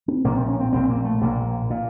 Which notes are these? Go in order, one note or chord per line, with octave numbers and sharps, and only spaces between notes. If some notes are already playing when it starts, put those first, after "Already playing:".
C4
A#1 A#2 A#3
C4
C#4
C4
A#1 A#2 C4
A#3
A3
A#1 A#2 A#3
A#2